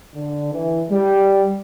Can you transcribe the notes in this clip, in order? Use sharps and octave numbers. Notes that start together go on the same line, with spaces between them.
D3
E3
G3